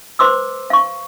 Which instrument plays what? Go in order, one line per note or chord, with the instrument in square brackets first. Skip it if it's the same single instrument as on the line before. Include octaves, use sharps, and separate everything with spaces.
[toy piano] B4 C5 C6 D6 E6
F5 C#6